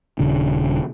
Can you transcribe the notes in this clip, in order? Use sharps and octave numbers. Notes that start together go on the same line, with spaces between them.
D#1 C#3 D4